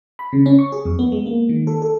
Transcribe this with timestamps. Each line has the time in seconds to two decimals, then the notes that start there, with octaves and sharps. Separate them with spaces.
0.19 B5
0.32 C#3
0.46 C#4
0.59 C#6
0.72 G#4
0.85 F2
0.99 B3
1.12 G#3
1.26 A#3
1.49 D#3
1.67 A4
1.82 A4